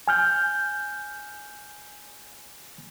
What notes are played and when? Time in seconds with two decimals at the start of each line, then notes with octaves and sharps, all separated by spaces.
0.08 G#5 F6 G6